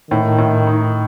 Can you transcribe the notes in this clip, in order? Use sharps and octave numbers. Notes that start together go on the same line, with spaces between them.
A2 D#3
A2
D#4